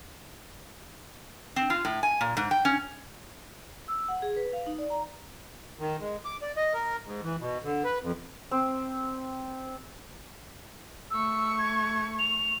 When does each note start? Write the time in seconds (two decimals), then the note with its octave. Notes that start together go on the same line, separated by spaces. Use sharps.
1.56 C4
1.70 F4
1.85 A2
2.03 G#5
2.21 A#2
2.37 G#2
2.51 G5
2.65 C#4
3.88 E6
4.08 F#5
4.22 G#4
4.37 B4
4.53 F5
4.67 D#4
4.78 D5
4.90 A#5
5.79 D#3
6.00 G#3
6.25 D6
6.42 D5
6.57 D#5
6.74 A#4
7.05 G#2
7.23 E3
7.40 B2
7.63 D3
7.84 B4
8.02 F2
8.51 C4
11.11 A3 C#6 E6
11.59 G#6
12.19 F7